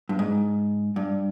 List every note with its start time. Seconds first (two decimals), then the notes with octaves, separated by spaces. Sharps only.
0.09 G2
0.19 G#2
0.96 G2